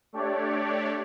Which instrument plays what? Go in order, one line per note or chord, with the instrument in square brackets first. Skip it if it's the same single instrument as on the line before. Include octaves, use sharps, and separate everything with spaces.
[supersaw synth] A3 D4 G4 C#5 D5